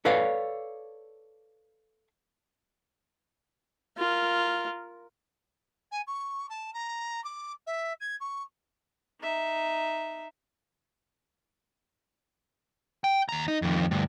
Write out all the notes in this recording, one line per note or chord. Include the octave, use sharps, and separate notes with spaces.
A4 B4 C#5 D5 F5
F4 A#4
G#5
C#6
A5
A#5
D6
E5
G#6
C#6
D#4 E5
G5
D#2 A#5
D#4
F2 D#3
D2 G2